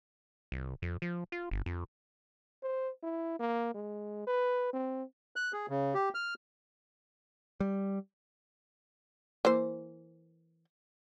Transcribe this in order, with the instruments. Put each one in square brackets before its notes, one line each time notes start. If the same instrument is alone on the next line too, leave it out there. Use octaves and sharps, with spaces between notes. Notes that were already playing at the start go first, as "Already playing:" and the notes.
[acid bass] C2
F2
F3
F4
G1
F2
[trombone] C5
E4
A#3
G#3
B4
C4
[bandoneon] F#6
G#4
C#3
G4
F6
[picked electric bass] G3
[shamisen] E3 A#3 C5